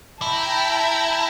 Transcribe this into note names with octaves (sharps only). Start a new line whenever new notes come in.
E4 G5 A5 A#5